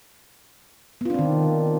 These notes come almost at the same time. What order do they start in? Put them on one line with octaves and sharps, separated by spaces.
B3 F4 D4 C4 D#3